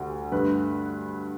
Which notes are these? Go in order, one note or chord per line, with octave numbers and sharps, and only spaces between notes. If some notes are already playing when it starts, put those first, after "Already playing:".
Already playing: D2 D3 G3
G2 D3 A3 B4